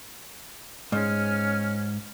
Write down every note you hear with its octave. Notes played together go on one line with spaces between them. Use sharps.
G#2 C#4 F6